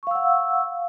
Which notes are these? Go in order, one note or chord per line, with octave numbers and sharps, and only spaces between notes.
F5 F#5 C#6 E6